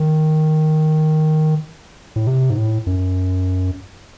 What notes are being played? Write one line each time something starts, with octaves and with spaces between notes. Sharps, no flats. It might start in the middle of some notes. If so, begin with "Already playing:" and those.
Already playing: D#3
A2
C3
G#2
A2
F#2